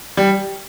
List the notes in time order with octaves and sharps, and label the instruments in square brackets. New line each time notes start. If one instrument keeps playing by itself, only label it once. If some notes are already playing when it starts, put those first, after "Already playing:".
[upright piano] G3